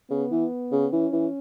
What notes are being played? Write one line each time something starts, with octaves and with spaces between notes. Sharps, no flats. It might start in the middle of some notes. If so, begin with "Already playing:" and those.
C#3 B3
E3
C#3
E3 C#4
E3